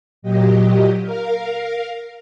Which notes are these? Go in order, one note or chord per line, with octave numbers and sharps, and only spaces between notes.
A#2 F#3 G4 D#5
A#4 F5